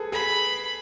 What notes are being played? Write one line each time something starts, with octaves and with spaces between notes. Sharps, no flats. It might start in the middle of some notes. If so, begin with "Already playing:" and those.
Already playing: G#4 A4 B4
G#4 B5